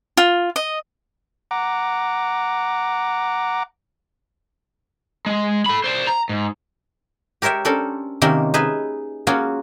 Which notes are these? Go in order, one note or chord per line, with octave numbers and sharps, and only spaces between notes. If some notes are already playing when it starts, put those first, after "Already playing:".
F4
D#5
F#5 A#5 D6
G#3
A4 B5
C5 D5
A#5
G#2
G4 A#4 C#5 E5 G5
C#4 D4 A4 A#4 C5
C3 D#3 A#3 C4 C#4
D#4 G#4 B4 E5
A#3 C#4 F4 F#4 G#4